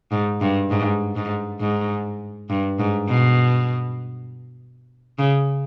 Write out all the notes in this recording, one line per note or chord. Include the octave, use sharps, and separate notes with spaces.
G#2
G2
G#2
G#2
G#2
G2
G#2
B2
C#3